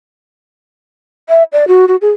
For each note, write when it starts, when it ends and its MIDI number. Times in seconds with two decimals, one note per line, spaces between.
1.29 1.43 76
1.52 1.65 74
1.68 1.85 66
1.88 1.96 66
2.01 2.11 68